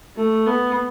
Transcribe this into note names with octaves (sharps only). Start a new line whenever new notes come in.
A3
B3